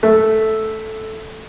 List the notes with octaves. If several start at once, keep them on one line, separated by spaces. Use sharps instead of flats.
A3